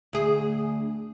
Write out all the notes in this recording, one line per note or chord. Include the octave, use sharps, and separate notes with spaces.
D2 G#4